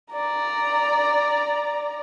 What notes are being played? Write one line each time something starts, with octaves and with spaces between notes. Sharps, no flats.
D5 A#5